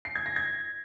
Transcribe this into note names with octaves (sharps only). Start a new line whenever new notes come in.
C7
G#6
A#6
G#6